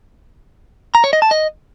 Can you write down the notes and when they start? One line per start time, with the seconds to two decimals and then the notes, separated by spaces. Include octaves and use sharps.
0.95 A#5
1.04 C#5
1.13 D#5
1.22 A5
1.31 D#5